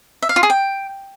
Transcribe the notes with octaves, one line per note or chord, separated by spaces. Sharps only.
E5
F5
F4
G#4
G5